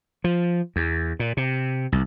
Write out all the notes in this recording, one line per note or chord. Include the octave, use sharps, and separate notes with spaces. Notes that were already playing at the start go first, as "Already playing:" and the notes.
F3
E2
A#2
C3
C2